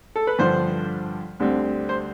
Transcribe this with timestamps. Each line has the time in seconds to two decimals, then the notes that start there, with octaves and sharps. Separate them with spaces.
0.16 A4
0.27 B4
0.39 G2 D3 F3 C5
1.40 D2 D3 G3 C4
1.89 C5